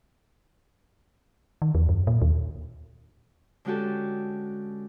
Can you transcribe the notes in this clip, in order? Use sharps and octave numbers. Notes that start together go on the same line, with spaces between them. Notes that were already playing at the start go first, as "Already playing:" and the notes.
D#3
E2
F#2
A#2
D#2
D3 G#3 C#4 F#4 G4 A4